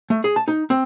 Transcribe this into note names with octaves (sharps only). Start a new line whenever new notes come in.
A3
G#4
A5
D#4
C4